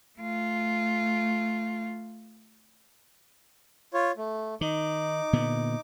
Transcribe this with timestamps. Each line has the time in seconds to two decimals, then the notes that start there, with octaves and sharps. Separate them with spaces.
0.18 A3 F4
3.93 F4 C#5
4.17 A3
4.61 D#3 D#4 D6
5.33 A#2 D3 B3